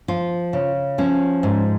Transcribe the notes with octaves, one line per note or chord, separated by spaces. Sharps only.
F3 F4
C#3
F3 C#4
G#2